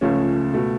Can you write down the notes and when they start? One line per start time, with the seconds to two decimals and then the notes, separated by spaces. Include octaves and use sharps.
0.01 C#2 C#3 F3 A3 C#4
0.54 B2 A3